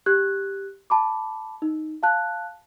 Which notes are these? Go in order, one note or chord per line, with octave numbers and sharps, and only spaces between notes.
G4 F#6 G#6
A5 B5 D6
D#4
F5 A5 F#6